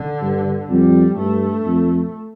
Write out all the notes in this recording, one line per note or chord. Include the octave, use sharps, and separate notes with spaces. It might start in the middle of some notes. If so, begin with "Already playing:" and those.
Already playing: D3
G2
F2 G3
G2 A3
F2